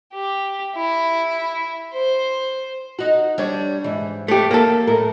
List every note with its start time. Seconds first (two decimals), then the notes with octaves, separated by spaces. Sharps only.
0.13 G4
0.76 E4
1.93 C5
2.99 D#4 F#4
3.38 G3 D4 C#5
3.84 G#2 E3
4.28 A3 G4
4.51 A#3 A4
4.87 F#2 A2 A#4